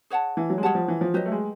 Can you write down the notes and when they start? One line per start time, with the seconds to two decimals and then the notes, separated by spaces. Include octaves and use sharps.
0.10 G#4 C#5 F#5 A5
0.37 E3
0.50 F#3
0.58 G#3
0.63 G3 G#4 C#5 F#5 A5
0.75 F3
0.88 E3
1.01 F3
1.14 F#3 G4 B4 D#5
1.26 A3
1.32 G#3